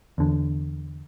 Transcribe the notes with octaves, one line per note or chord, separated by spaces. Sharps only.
E2 D3